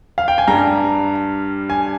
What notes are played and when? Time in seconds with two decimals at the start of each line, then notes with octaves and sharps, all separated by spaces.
0.18 F5
0.28 G5
0.38 G#5
0.47 G2 G3 A#5
1.70 G#5